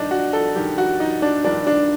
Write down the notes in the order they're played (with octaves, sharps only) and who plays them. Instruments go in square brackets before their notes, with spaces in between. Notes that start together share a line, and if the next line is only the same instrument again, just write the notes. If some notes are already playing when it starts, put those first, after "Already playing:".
Already playing: [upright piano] G2 D#3 D4 D#4
F#4
A4
G2 D#3 G4
F#4
D#4
D4
G2 D#3 D4
D4